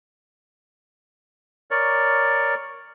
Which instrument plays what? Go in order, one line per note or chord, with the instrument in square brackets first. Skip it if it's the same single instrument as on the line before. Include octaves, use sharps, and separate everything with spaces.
[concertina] A#4 C#5 D5